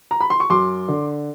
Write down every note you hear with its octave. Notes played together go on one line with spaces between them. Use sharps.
A#5
B5
C6
C#6
F#2 C6 D6
D3